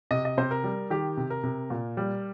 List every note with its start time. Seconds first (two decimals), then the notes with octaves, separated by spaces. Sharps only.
0.11 C3 D#5
0.25 D#5
0.38 C3 C5
0.51 A#4
0.64 G3
0.90 D#3 G4
1.17 C3
1.30 A#4
1.43 C3
1.70 A#2
1.97 G3